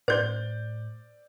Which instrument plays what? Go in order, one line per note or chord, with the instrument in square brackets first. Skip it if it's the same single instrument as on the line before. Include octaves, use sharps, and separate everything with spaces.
[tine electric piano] A2 [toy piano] C5 [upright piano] D5 G6